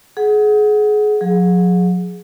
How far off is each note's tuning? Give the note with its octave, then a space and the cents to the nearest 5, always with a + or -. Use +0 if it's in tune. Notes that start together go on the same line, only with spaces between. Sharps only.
G#4 +25 F#5 +0
F#3 -45 G#4 +0